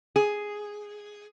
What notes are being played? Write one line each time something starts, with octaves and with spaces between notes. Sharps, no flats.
G#4